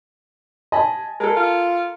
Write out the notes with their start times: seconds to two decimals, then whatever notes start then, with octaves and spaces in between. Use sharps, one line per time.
0.72 D#5 G#5 A5 B5
1.20 G#3 A4 A#4
1.36 F4